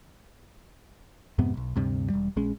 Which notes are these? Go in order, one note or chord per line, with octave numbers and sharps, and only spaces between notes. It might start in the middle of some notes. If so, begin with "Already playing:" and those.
F2 G#2 C3 B3
E1 B1
D2 G2 C3
E1 G3
A#1 G#3 C#4